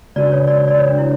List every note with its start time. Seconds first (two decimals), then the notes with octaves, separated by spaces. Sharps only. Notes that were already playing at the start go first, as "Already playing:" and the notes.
0.16 C#3 G#3 D4 F#4 B4 D5
0.32 C#5
0.48 D5
0.68 D5
0.78 C#5
0.89 D4
0.99 E4